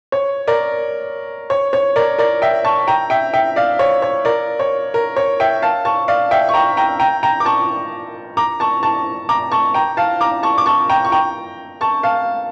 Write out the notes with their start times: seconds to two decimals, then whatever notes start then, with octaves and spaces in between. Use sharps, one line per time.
0.12 C#5
0.47 A#4 D5
1.50 C#5
1.73 C#5
1.96 A#4 D5
2.19 A#4 D5
2.42 E5 G5
2.64 A5 C#6
2.88 G5 A#5
3.10 E5 G5
3.34 E5 G5
3.56 D5 F5
3.79 C#5
4.02 C#5
4.25 A#4 D5
4.60 C#5
4.94 A#4
5.17 C#5
5.40 E5 G5
5.62 F5 A5
5.85 A5 C#6
6.08 D5 F5
6.31 E5 G5
6.49 C#6
6.54 G5 A#5
6.77 G5 A#5
7.00 G5 A#5
7.23 G5 A#5
7.40 D6
7.45 A5 C#6
8.37 A#5 D6
8.60 A5 C#6
8.83 A5 C#6
9.29 A#5 D6
9.52 A5 C#6
9.74 G5 A#5
9.97 F5 A5
10.21 A#5 D6
10.43 A5 C#6
10.58 D6
10.66 A5 C#6
10.89 G5 A#5
11.05 C#6
11.12 G5 A#5
11.81 A5 C#6
12.03 F5 A5